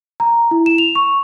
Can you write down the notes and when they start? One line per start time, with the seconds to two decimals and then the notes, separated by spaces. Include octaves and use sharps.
0.20 A#5
0.51 E4
0.66 E7
0.78 F7
0.95 C#6